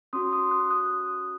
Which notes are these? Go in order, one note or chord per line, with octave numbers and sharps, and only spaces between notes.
C#4 F#4 C6 D#6
C6 D#6
D#6 F#6
D#6 F#6